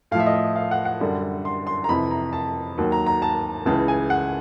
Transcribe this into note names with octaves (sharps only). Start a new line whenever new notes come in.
A2 F3 E5 F5
D#5
E5
F5
F#5
F#5
F#2 D3 G3
C6
C6
A#5
F2 C3 E3 B5
A#5
A5
D#2 D#3 F#3
A#5
A#5
A5
C#2 C#3 E3 A5
G#5
F#5